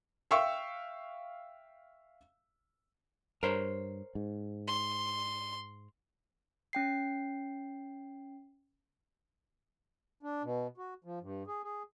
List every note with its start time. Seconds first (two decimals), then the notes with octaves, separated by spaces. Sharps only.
0.31 E5 F5 G5 C#6 E6
3.43 G2 A#4 C5 C#5
4.15 G#2
4.67 C6
6.73 C#4 G5 C7
10.23 D4
10.43 B2
10.77 F#4
11.04 F3
11.21 G2
11.47 G#4
11.63 G#4